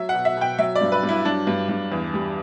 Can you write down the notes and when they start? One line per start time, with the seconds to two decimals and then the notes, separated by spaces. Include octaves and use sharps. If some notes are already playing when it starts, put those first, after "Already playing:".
Already playing: F#3 E5
0.09 F#5
0.14 B2
0.25 E5
0.37 B2 G5
0.58 F#3 E5
0.75 D5
0.81 G2
0.92 B4
1.03 G2
1.09 E4
1.25 F#3 D4
1.47 G2
1.69 G2
1.92 E2
2.14 G3